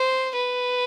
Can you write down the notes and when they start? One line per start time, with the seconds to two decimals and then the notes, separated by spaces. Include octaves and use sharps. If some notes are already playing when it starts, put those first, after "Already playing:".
Already playing: C5
0.35 B4